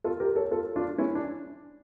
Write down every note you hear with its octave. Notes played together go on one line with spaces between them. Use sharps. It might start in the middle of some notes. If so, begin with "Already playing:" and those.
F4 A4
G4 A#4
A4 C#5
F4 A4
D4 F4
C#4 E4
D4